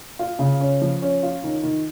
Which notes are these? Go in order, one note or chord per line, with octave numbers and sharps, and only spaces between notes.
F4
C#3
C#4
F3
C#4
F4
D#3
D#3